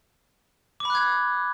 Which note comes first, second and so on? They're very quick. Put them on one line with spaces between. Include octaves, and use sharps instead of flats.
D6 B5 F#6 G#6